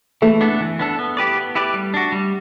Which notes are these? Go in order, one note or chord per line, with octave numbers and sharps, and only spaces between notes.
E3 A3
B3 D4 A4
E3
B3 D4 A4
B3
E4 G4 B4 D5
B3
E4 G4 B4 D5
G3
D4 F#4
G3